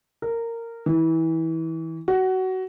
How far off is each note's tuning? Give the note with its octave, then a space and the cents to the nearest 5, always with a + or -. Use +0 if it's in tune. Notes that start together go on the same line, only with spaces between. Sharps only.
A#4 -15
E3 -25
F#4 +20